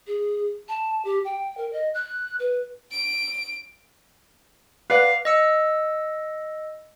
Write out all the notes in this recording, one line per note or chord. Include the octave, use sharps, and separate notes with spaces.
G#4
A5
G4
G5
A#4
D#5
F#6
B4
D7
B4 D5 F5 F#5
D#5 E6 C#7